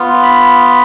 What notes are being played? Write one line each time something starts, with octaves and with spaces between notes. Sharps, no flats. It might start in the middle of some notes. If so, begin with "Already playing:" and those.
Already playing: B3 F4
B5